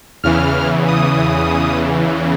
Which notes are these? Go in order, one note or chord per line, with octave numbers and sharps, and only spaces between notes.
E2 C#3 E3 F6
D#6